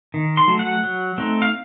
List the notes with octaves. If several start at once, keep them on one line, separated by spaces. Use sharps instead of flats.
D#3
C6
F#3 A3
F#5
F#3
A3 C4 D#4
F5